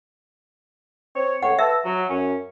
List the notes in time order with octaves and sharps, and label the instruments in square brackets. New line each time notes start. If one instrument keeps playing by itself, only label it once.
[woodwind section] C4 C#5
[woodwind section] C#2 A3 C#5 [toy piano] F#5
[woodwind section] B4 A5 E6 [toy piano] E5
[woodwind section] F#3
F#2 C#4